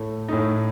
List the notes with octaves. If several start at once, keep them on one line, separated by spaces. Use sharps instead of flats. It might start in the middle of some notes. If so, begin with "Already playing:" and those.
Already playing: A2 A3
A2 A3 D#4